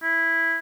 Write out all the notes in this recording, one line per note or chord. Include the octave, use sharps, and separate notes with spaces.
E4